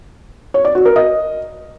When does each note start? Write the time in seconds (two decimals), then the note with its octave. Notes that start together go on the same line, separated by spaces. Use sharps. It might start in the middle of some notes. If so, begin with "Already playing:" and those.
0.54 C#5
0.65 D5
0.75 F#4
0.85 A#4
0.96 D#5